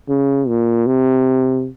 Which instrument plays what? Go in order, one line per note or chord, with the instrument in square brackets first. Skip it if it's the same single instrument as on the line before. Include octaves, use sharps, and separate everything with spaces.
[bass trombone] C#3
A#2
C3